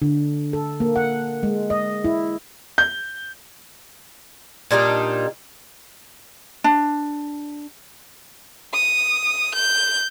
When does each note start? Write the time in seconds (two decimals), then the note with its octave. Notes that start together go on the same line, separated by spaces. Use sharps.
0.02 D3
0.53 A4
0.80 A#3
0.96 F#5
1.43 G#3
1.70 D#5
2.04 E4
2.78 G6
4.71 A#2 G3 D4 D#4
6.64 D4
8.73 D#6
9.54 G6